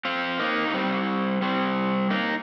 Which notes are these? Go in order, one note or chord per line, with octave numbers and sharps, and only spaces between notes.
C4 F4
A#3 D#4
A#3
G3 C4
G3 C4
A#3 D#4